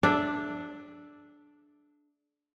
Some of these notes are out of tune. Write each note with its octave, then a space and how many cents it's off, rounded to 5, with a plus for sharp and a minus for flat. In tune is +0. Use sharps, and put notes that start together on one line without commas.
D4 +0 A4 -45 E5 +0